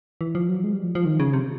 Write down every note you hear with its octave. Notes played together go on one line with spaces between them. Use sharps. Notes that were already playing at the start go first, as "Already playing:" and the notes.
E3
F3
F#3
G#3
G3
F3
F3
D#3
C#3
C3